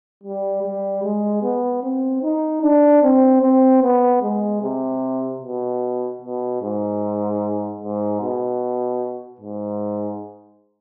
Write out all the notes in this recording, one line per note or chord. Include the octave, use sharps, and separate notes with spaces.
G3
G3
G#3
B3
C4
D#4
D4
C4
C4
B3
G#3
C3
B2
B2
G#2
G#2
B2
G#2